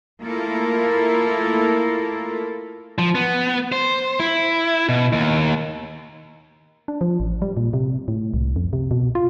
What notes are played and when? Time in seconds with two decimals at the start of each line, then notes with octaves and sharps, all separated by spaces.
0.23 A3 A#3 E4 F4 A4 A#4
2.99 F3
3.15 B3
3.72 C5
4.19 E4
4.89 B2
5.13 D#2
6.88 D4
7.01 F3
7.20 A1
7.42 G3
7.57 A#2
7.73 C3
8.08 A2
8.34 C2
8.56 F2
8.73 C3
8.91 B2
9.15 F4